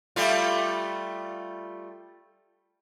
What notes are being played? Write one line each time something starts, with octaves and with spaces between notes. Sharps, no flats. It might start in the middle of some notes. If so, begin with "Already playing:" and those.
G3 A3 F4